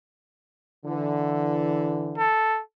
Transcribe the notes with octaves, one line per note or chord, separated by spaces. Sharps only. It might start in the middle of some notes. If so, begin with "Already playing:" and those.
D3 E3
A4